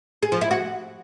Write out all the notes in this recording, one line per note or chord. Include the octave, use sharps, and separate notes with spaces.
G#4
F3
E4
F#4